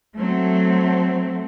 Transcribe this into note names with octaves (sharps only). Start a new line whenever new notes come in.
F#3 A3 C4